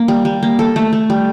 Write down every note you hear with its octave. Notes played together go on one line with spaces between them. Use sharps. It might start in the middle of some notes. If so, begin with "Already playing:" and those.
Already playing: A#3 A#4
G3
G3
A#3
A4
A3
A3
G3